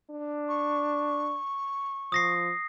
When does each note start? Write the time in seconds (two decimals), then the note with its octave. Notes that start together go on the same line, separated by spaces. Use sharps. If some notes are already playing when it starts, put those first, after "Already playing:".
0.10 D4
0.49 C#6
2.12 F3 D#6 A#6 C7